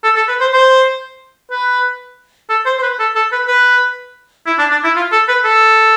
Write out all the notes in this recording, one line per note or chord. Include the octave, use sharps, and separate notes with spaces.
A4
A4
B4
C5
C5
B4
A4
C5
C5
B4
A4
A4
B4
B4
E4
D4
D4
E4
F4
A4
B4
A4